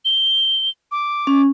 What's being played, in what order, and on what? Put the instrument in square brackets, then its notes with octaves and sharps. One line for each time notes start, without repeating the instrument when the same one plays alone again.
[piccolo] G7
D6
[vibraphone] C#4